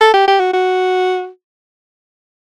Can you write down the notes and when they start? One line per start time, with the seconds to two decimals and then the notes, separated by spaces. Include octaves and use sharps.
0.01 A4
0.14 G4
0.28 G4
0.40 F#4
0.54 F#4